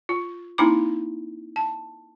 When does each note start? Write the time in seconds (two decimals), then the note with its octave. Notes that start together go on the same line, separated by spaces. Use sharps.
0.09 F4
0.58 A#3 C4 D#4 E4 A#5 D6
1.56 A5